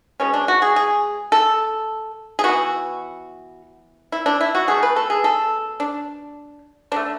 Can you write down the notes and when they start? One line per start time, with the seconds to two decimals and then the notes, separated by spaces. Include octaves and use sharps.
0.20 B2 G#3 B3 C#4
0.34 D4
0.48 F#4
0.62 G#4
0.76 G#4
1.32 A4
2.39 G#4
2.44 E3 B3 F#4
4.12 E4
4.26 D4
4.41 E4
4.55 F#4
4.68 B2 A3 G#4
4.83 B4
4.96 A4
5.10 G#4
5.24 A4
5.80 D4
6.92 D3 A3 D4